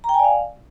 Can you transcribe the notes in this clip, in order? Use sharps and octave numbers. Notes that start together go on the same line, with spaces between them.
A#5
G5
G#5
D5
F5